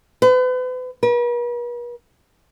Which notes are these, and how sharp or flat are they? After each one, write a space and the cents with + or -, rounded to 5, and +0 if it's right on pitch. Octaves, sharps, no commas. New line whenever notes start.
B4 +40
B4 -45